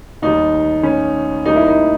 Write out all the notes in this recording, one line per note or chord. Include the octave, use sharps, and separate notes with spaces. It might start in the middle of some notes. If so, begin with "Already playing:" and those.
D#2 D#3 G3 D#4
C#4
D#2 D#3 G3 A#3 D#4
E4
D#4